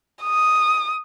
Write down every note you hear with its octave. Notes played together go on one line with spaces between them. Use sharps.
D#6